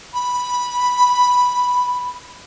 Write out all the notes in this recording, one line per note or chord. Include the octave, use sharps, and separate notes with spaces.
B5